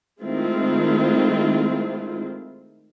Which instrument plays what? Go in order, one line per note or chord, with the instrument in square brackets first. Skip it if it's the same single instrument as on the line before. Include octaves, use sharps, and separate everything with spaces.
[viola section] D#3 G#3 A3 C4 E4 F4